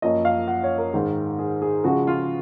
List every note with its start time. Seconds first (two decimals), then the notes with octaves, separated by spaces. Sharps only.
0.02 F#2 F3 A#3 C#4 D#5
0.25 F5
0.48 F#5
0.64 C#5
0.78 A#4
0.93 G#2 D#3 G#3
1.39 G#4
1.62 G#4
1.84 C#3 F3 G#3 F#4
2.07 F4